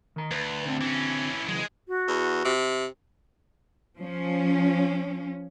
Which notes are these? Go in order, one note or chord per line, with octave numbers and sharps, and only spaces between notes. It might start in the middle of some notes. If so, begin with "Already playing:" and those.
D#3 A#5
D2 B4
D3 C4
E3 C#4
C#3 E3 F#3 G#3 G#4
F#4
E2
C3
F3 C#4